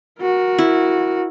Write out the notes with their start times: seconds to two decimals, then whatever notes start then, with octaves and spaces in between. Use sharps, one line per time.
0.21 F#4 A#4
0.58 E4